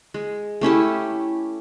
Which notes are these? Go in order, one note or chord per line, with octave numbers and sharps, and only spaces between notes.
G#3
A3 C#4 E4 G4